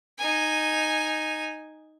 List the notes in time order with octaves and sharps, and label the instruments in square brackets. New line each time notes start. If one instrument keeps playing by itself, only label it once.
[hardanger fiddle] D#4 G#5